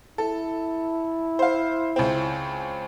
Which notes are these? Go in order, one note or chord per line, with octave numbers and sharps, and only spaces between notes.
E4 A4
C5 F5
C#2 C4